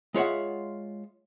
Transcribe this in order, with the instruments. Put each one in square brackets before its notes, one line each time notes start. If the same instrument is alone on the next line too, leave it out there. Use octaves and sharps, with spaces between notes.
[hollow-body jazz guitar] G#3 F4 C#5 E5 F#5